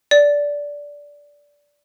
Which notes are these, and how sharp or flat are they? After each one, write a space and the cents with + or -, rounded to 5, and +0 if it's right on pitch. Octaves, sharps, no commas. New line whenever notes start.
D5 -15